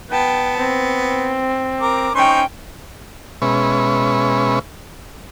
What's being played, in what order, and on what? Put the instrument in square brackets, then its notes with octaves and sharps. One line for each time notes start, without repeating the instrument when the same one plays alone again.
[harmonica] B3 [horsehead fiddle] G5 A5
[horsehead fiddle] C4
[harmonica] A#4 D6
[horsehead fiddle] C#4 G5 [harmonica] D#4 C5 C#6
[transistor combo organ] B2 G#3 C#4 B4 E5 C#6